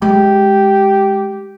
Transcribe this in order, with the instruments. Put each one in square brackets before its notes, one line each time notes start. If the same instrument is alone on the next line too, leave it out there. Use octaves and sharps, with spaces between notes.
[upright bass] G#3 [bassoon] G4